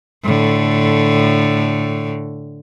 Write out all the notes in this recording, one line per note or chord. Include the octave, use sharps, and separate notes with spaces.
A2 D3